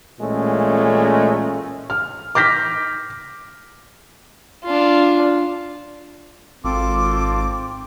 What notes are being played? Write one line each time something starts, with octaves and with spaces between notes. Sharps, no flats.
A1 A#2 G#3 A3 C#4
F6
D6 F6 G6 A#6 B6
D4 F4
G#1 C4 F4 A4 D6